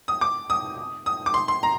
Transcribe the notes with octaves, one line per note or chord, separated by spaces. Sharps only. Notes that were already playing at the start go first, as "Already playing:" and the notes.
D#6
D6
D#6
D#6
D6
C6
C6
A#5